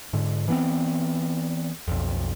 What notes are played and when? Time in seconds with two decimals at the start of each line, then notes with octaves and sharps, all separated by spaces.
0.13 G#2 D3
0.48 E3 B3 C4
1.88 B1 F2